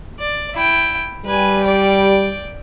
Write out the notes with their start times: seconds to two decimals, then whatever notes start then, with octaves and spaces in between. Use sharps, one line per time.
0.20 D5
0.54 E4 G5
1.25 G3 B4 G#5
1.64 D5 G5